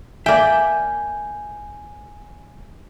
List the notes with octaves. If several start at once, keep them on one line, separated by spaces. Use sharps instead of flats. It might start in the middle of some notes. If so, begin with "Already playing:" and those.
A#3 D5 E5 G5 G#5 G6